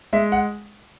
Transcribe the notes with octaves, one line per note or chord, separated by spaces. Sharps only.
G#3 E5
F#5